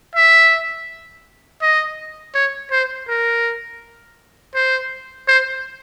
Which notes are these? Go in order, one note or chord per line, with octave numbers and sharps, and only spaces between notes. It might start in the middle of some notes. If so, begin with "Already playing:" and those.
E5
D#5
C#5
C5
A#4
C5
C5